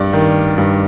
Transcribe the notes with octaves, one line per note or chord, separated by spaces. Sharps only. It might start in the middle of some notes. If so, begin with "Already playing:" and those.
Already playing: G2 D5
D#3
G2